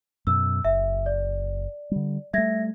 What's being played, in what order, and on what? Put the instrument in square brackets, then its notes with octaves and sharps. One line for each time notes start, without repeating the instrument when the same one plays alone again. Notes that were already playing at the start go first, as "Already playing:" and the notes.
[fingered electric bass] F#2 B2 [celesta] E6
[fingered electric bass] F#1 [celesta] E5
[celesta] D5
[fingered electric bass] D3 G3
[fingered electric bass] G3 A3 [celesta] E5 G#6 A#6